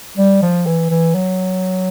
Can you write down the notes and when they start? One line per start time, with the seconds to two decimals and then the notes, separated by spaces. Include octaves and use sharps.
0.18 G3
0.42 F3
0.66 E3
0.91 E3
1.15 F#3